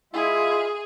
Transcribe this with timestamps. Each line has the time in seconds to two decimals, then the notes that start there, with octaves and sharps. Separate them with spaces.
0.13 G#3 E4 F4 G#4 E5